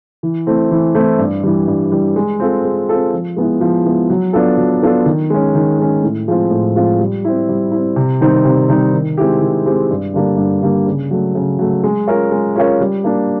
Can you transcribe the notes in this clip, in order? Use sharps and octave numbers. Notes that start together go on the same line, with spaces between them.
E3
A3 C4 E4
E3
A3 C4 E4
G2
E3 G3
G2
E3 G3
G#3
C4 F4 A4
G#3
C4 F4 A4
F3
G#3 B3 E4
F3
G#3 B3 E4
F#3
B3 D4 F4 A4
F#3
B3 D4 F4 A4
D#3
G#3 C#4
D#3
G#3 C#4
A2
F3 G#3 C4 F4
A2
F3 G#3 C4 F4
G3
C4 E4
G3
C4 E4
C3
D#3 G3 C4 D#4
C3
D#3 G3 C4 D#4
D#3
G#3 C4 E4 G4
D#3
G#3 C4 E4 G4
G2
D3 G3 A#3 D4
G2
D3 G3 A#3 D4
C#3
F#3 A3
C#3
F#3 A3
G#3
C#4 F4 A#4 C#5
G#3
C#4 F4 A#4 C#5
G3
A#3 D4